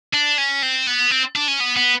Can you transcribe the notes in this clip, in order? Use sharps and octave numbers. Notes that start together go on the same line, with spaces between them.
D4
C#4
C4
B3
C4
D4
C#4
B3
B3